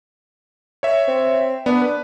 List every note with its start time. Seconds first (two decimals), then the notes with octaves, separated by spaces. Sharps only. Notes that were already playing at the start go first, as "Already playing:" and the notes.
0.83 C#5 E5
1.08 C4
1.66 B3 D4
1.82 B4